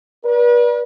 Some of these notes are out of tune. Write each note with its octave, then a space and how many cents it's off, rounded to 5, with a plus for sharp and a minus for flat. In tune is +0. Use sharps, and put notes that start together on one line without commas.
B4 -40 D5 +0